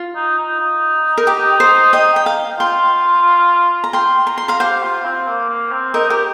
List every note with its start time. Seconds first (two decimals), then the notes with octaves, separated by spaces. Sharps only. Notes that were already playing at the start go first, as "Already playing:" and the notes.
Already playing: F4
0.15 D#4
0.38 D#4
0.60 D#4
1.18 A#4
1.27 G4
1.60 C5
1.93 D#5 G5
2.16 G5
2.26 F5 A#5
2.60 F4 G5 C6
3.84 A#5
3.93 F4 G5 C6
4.27 A#5
4.38 C6
4.48 F5 A#5
4.60 G4 C5 F5
4.83 F4
5.05 C4
5.27 A#3
5.49 A#3
5.72 C4
5.94 D#4 A#4 D#5
6.10 G4 A#4